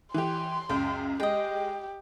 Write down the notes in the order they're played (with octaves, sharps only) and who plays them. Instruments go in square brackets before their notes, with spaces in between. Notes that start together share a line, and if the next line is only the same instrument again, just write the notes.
[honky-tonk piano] E3 G4 [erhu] C6
[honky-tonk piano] C#2 F#2 [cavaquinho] G5
[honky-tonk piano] G#3 [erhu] G4 [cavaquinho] D#5 G5